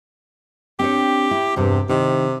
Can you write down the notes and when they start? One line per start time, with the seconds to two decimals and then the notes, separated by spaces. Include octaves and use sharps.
0.79 C4 D4 G4 C#5
1.31 E4
1.56 E2 G2 C3
1.89 C3 D#3 E4